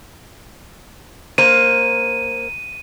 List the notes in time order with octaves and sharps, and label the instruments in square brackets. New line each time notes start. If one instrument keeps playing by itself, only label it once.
[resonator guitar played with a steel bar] A#3 A#4 C5 [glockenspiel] D#7